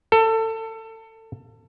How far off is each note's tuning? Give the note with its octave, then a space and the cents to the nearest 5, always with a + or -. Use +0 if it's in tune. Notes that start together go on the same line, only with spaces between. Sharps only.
A4 +25